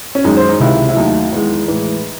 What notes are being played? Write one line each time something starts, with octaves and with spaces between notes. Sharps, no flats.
C#4
F#2 D#3 G#3 D#4
C5
D#4
C#2 C3 D#3 E4
E4
D#2 D#3 F#3 A3 D#4
E2 D#3 G#3
A2 E3 G#3